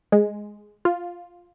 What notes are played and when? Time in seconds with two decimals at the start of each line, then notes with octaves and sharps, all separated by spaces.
0.12 G#3
0.85 F4